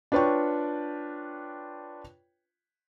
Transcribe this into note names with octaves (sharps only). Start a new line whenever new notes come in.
D4 F4 B4 C#5 G5 C#6